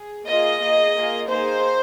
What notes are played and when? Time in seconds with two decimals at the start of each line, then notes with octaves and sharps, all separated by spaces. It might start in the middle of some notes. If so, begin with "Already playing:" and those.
Already playing: G#4
0.26 A#3 F4 G#4 D#5
0.60 A#3 G#4
0.95 A#3 F4 G#4
1.29 A#3 D#4 G#4 C5